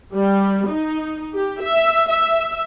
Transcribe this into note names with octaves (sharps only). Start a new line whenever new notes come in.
G3
D#4
G4
E5
E5